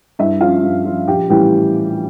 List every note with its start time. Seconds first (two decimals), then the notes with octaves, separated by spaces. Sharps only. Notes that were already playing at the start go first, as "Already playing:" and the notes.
0.19 G2 E4 E5
0.41 F3 C#4 F4 F5
0.63 G2
0.85 F3 C#4 F4
1.08 A#1 G4 G5
1.29 A2 E3 G3 C#4 G4 G5